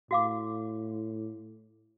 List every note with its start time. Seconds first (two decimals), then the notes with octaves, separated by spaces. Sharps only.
0.11 A2 F#4 F5 D6